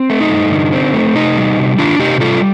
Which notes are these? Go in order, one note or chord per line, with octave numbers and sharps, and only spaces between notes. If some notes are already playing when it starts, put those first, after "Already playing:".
Already playing: C4
A3
D#4
G2
D3
C4
A3
C3 D#4
G3
C3
D#3 D4 F4
C3 D#4 G4
G3 F4 A4